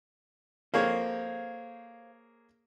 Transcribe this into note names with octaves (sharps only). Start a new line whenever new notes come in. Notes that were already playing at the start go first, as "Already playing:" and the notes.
A#3 G#4 A4 C5 C#5 F5